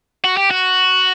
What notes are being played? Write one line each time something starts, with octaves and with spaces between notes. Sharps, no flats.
F#4
G4
F#4